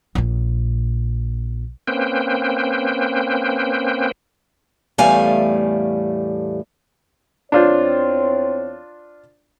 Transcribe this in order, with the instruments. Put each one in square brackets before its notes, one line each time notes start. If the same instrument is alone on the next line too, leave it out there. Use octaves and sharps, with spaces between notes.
[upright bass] A#1 A#2
[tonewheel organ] A#3 C4 C#4 B4 C5 G5
[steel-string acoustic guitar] E2 A2 G3 A3 F5 G#5
[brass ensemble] E2 C4 C#5 [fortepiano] D4 F4 C5